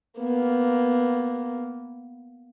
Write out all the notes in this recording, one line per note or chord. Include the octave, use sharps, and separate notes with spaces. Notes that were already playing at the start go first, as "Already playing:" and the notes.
A#3 B3